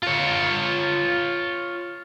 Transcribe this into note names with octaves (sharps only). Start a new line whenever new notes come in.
F4 C#5